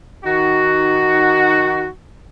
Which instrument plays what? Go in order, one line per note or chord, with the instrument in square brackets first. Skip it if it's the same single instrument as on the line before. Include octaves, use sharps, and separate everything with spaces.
[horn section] D#3 D#4 F#4